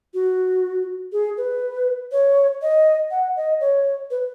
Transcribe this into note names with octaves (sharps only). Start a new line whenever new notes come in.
F#4
G#4
B4
C#5
D#5
F#5
D#5
C#5
B4